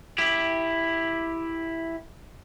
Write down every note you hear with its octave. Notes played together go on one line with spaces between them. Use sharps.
E4 G4